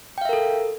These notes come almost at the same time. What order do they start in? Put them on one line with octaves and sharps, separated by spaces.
G5 F5 E5 A#4 A4